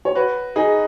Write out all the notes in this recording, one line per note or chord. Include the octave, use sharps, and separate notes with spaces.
C#5
F#4 B4
D#4 G#4